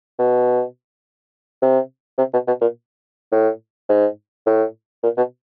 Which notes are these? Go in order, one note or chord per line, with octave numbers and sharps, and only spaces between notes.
B2
C3
C3
B2
B2
A#2
A2
G#2
A2
A#2
B2